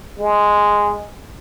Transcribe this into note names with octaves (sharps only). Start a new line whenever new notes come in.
G#3